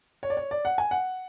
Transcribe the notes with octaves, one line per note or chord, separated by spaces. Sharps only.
C#5
D5
C#5
D5
F#5
G#5
F#5